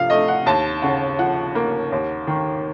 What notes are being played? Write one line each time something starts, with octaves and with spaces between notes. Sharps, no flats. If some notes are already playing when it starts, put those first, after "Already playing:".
Already playing: C3 F3 F5
A3 D#5
F#5
D#2 A5
C#3 F#5
F3 F#5
A#3
D#2
D#3